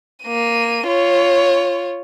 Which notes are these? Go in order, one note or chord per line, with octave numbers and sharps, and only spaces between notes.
A#3 D#7
F4 C#5